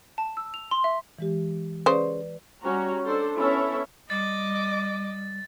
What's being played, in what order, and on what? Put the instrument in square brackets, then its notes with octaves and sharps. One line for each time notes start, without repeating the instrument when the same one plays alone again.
[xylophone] A5
E6
F7
C6
E5
[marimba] E3 G#3 G4
[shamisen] C#3 C5 [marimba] B4 D5
[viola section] G3 C#4 F#4 A#5
D4 A4 C5
B3 C#4 E4 A4 C#5 E5
[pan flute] G3 [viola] D#5 D6 [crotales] A6